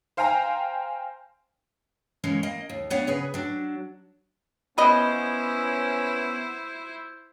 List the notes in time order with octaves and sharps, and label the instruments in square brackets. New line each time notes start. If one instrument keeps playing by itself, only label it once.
[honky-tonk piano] C5 F5 G5 G#5 A#5
[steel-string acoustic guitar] E3 G#3 A#3 C#4
A#3 D#5
D#2
B3 D4 C#5 F5 F#5
C#3 G#4 B4
F#3 D4
[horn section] B3 C#4 [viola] E4 C5 [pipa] B4 D#5